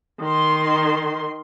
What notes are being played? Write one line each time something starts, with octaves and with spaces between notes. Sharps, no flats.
D#3 C6